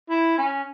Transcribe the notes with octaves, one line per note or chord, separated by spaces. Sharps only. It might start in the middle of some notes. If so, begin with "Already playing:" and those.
E4
C#4